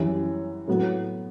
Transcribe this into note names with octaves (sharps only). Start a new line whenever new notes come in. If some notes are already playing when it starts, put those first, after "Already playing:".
Already playing: F#2 E3 G3 C#4
A2 F#3 B3